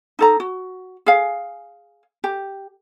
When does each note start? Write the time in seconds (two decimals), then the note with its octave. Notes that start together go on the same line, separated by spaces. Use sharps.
0.19 D#4 A4 A#5
0.40 F#4
1.06 G#4 F5
2.24 G4